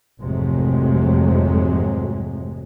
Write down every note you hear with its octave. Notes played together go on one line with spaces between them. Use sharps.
G#1 F2 C3 F#3 G#3 A3